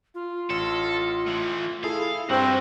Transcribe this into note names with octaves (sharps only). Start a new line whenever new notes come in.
F4
A1 A4
A2 E3
E4 G#4 A4 F5
G2 C4 F#4 A#4